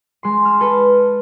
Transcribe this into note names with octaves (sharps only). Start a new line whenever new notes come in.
G#3 C6
F6 E7
A4 B4